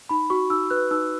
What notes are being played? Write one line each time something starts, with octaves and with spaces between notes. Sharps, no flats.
D#4 B5
F#4 C#6
D#4 E6
B4 F#6
D#4 E6